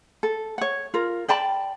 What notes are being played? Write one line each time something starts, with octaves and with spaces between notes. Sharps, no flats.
A4
C#5 F#5
F4 A#4
D5 G5 A5 B5